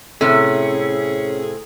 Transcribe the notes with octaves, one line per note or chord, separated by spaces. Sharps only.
A2 C3 C#4 G#4 A4